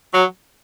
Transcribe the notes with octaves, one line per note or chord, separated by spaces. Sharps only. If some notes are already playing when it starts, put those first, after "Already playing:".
F#3